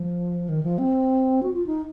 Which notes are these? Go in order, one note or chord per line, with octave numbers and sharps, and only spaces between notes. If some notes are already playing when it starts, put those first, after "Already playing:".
Already playing: F3
D#3
F3
C4
F#4
F4
D#4